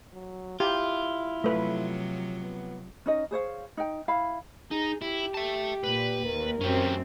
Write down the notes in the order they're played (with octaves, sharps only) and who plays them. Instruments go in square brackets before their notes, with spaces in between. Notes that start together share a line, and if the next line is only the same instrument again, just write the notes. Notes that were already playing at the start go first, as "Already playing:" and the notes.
[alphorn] F#3
[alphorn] E4 [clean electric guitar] F4 [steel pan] G4
[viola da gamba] C3 F3 F#3 [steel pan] A3 B4
[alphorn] B3
[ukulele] C#4 D#4 D#5
G#4 C5 C#5 F5
D#4 G5
E4 F5 B5
[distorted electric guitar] D#4 [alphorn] G#4
[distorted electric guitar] E4 [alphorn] G4
[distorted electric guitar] E5 A5
[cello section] A#2 [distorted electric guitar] B4
[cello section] D#2 [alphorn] A#4
[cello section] F#2 C4 [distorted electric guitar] C#4 G4